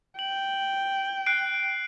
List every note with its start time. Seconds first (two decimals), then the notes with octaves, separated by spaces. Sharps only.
0.19 G5 F#7
1.26 F#6 C7 D7